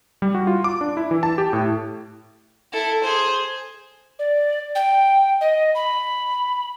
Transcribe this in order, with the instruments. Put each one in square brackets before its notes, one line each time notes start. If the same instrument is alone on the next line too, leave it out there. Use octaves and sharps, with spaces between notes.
[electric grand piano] G3
F#4
F4
D6
D4
E4
E3
A5
G4
A2
[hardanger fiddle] E4 A4
G#4 C5
[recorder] D5
G5
D#5
B5